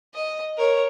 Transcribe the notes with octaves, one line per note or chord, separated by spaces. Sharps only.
D#5
A#4 C#5